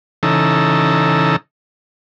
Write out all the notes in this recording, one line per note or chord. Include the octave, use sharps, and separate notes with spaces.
C#3 E3 D#4 A4 A#5 E6